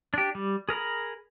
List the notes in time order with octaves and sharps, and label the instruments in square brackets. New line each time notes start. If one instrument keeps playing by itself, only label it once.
[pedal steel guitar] D4 G4
G3
G#4 A#4 A#5 B5